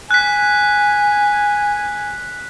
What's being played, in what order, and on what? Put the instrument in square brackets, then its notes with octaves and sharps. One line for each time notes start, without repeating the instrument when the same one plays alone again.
[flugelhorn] G#5 [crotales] F#6 B6